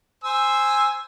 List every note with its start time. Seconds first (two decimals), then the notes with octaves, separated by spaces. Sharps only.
0.24 C5 G#5 E6